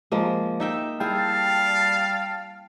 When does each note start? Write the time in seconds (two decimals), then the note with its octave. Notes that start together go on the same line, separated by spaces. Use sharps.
0.12 F3 G#3 A#3
0.60 D#4 E5 G5
1.00 G3 E4 G#4 F5 G5 A5